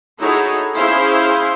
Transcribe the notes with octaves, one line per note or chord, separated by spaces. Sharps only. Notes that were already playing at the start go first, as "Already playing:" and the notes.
D#4 E4 F#4 G#4 A4 C#5
C#4 E4 G#4 C5 F5 C6